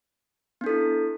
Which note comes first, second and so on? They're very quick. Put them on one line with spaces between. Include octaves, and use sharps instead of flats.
B3 D4 A4 E4